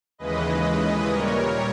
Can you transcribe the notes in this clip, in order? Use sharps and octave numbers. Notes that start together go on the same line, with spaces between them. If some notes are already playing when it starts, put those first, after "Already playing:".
D#2 C#3 E3 G#3 B4 D#5
A#2 G3 A#4 C#5